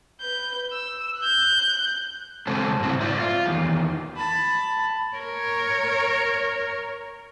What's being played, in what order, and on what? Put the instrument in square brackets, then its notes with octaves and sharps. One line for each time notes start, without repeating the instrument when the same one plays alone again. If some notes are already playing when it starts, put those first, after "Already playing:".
[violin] B4 G6
E6
F#6 G6
[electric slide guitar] C#3 G#3 C4 A4 C5 A5
G#2 C#3 C4 E4
G#2 C5 D5 E5
F4
E2 D#3
[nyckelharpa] A5 B5
[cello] A#4 C#5